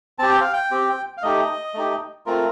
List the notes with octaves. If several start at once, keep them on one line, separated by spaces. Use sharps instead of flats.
C4 G4 A5
G5
F5
G5
C4 G4
F5
A3 D#4 G4 D#5
A3 D#4 G4
A3 C4 F4 A#4